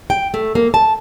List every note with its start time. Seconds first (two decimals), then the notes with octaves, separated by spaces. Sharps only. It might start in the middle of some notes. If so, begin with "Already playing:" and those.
0.10 G5
0.34 A3
0.55 A#3
0.74 A5